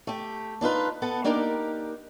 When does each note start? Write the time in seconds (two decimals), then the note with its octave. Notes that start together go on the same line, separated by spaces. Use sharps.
0.07 A3 G4
0.61 D4 D#4 F4 B4
1.02 B3 A4 A5
1.24 A#3 D4 D#4 G4 A#4 D5